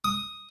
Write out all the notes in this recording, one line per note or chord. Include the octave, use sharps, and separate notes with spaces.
D#6